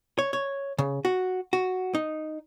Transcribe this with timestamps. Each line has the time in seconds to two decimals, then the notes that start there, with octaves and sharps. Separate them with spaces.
0.19 C#5
0.33 C#5
0.78 C#3
1.05 F#4
1.53 F#4
1.95 D#4